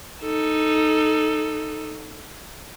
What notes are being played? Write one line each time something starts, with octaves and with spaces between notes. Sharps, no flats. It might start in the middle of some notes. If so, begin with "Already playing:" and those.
D#4 A4